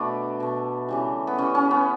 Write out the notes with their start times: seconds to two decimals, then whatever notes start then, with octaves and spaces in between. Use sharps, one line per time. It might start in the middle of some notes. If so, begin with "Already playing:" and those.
Already playing: B2 A3 D4 B4
0.40 B2 A3
0.89 C#3 E3 G3
1.27 B3
1.38 C#3 E3 G3 C#4
1.55 C#4
1.71 B3